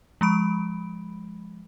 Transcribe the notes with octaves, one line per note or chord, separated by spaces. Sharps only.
F3 G#3 B5 D7